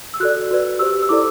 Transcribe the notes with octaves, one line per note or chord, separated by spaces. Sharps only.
E6
F#4 A4 D5 F#6
F#4 B4 D5
G4 C5 E6
E6
E4 A4 D5 D6